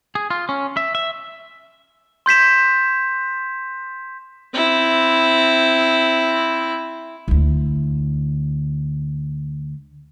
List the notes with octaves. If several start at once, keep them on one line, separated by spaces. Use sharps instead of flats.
G#4
F4
C#4
E5
E5
C6 G6 B6 E7
C4 E4
D2 E4